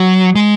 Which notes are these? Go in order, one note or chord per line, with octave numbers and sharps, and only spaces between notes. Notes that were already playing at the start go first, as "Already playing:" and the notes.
Already playing: F#3
G#3